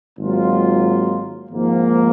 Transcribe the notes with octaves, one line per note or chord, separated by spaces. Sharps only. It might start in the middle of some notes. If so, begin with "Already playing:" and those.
G#1 G#2 F#3 A#3 F4
G#1 G#2 F3 A#3